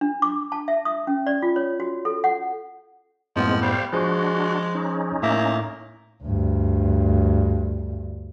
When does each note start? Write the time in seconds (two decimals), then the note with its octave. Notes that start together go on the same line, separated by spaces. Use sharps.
0.01 D4
0.22 D6
0.52 A5
0.68 E5
0.85 D#6
1.07 C#4
1.27 D5
1.42 F4
1.56 C#5
1.80 F#4
2.05 A4
2.24 F#5
3.36 F#2 A2 F3 G#3 B3 C4
3.62 G3 C5 F5
3.93 F3 G#3 D4 F#4 G#4 C5
4.75 C#4 D#4
5.23 A2 A#3 E5
6.24 D2 G2